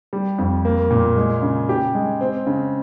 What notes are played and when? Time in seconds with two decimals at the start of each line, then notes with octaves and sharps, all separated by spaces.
0.13 G3
0.38 F2
0.65 A#3
0.91 A#2
1.17 G#3
1.42 C#3
1.69 G4
1.95 G#3
2.21 C4
2.47 C#3